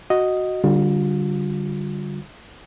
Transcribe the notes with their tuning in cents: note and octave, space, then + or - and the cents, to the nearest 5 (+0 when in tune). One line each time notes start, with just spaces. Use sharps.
F#4 +0 D#5 +0
D3 +0 G3 -5 F4 +35